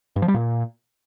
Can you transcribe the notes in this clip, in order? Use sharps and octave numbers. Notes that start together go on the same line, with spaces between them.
G2
F3
G3
A#2